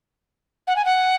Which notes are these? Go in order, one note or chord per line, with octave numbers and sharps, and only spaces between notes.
F#5
G#5
F#5